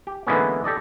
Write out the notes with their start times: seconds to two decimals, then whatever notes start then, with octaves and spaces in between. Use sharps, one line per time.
0.07 G4
0.27 D3 E3 G#3 A#3 B3 C#4
0.64 G4 A4 D5 D#5